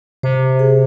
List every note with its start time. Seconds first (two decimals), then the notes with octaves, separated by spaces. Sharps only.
0.23 C3 C5
0.59 G#4